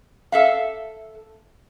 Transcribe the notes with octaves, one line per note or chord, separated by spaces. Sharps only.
A4 E5 F5